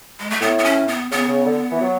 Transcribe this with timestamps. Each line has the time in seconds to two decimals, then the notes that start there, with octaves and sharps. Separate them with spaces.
0.20 G#3
0.30 A3
0.41 A2 B3
0.58 B3
0.64 C#4
0.88 B3
1.11 C#3 B3
1.28 C#3
1.45 D3
1.71 E3
1.81 F#3